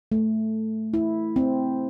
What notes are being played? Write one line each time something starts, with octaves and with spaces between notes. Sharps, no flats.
A3
E4
C4